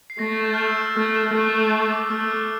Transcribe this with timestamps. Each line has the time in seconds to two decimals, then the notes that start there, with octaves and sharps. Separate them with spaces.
0.10 C7
0.19 A3 A#6
0.32 A6
0.45 G6
0.54 F6
0.58 G6
0.67 E6
0.86 E6
0.96 A3 F6
1.06 G6
1.14 F6
1.34 A3
1.72 F6
1.82 E6
1.91 D6
2.00 E6
2.10 A3 F6
2.20 E6
2.31 F6